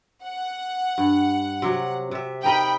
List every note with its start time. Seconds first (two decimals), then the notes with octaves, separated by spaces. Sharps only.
0.23 F#5
0.98 G2
1.62 C3 F#3
2.11 C3 E5
2.44 D#4 A#4 D#5 G5 B5